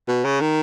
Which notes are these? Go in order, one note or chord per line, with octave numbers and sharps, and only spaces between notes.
B2
C#3
D#3